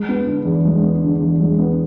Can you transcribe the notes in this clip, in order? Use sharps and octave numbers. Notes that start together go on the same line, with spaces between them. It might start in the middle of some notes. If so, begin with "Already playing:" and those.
Already playing: G#3
B3
D3
E2
G#3
B3
D3
E2
G#3
B3